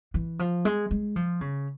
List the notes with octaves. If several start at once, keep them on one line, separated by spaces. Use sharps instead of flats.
E3
F3
G#3
G#3
F3
C#3